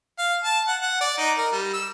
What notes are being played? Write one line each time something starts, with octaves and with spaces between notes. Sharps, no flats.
F5
A5
F#5
F#5
D5
D#4
A#4
G3
E6